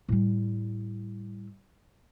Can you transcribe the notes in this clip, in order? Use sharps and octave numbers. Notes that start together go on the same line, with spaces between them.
A2 G3